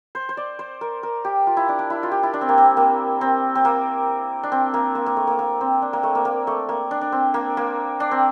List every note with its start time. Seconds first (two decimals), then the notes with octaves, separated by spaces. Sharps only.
0.15 C5
0.29 C5
0.37 D5
0.59 C5
0.81 A#4
1.03 A#4
1.25 G4
1.47 F4
1.57 E4
1.69 D4
1.79 D4
1.90 E4
2.03 F4
2.12 G4
2.23 E4
2.33 D4
2.41 C4
2.49 A#3
2.58 C4
2.77 A#3
3.21 C4
3.55 C4
3.65 A#3
4.43 D4
4.52 C4
4.74 A#3
4.95 A#3
5.06 A#3
5.17 A3
5.27 A#3
5.39 A#3
5.61 C4
5.82 D4
5.93 A#3
6.03 A3
6.15 A#3
6.25 A#3
6.47 A3
6.69 A#3
6.91 D4
7.01 D4
7.12 C4
7.34 A#3
7.57 A#3
8.00 D4
8.11 C4